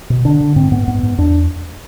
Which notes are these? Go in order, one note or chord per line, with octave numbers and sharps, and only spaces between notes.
B2
D3 D4
D3
G#2 C4
G#2 B3
G#2 B3
G#2
E2 D4